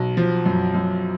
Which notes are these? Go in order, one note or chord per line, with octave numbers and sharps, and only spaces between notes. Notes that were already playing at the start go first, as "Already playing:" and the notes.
Already playing: B1
F3
F#2
F#2